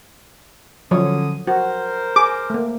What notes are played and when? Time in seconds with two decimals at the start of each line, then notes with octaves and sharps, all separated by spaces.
0.91 D3 F3 F#3 C#4 C#5 D#6
1.47 F#4 A#4 C5
2.16 G#4 D6
2.50 A3 A#3